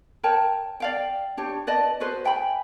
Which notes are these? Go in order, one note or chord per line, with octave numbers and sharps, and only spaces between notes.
A#4 C#5 G5 A5
D5 F5 G5
D4 G4 C#5
B4 D5 D#5 A5
F#4 G#4 B4 C5
E5 G5 G#5 B5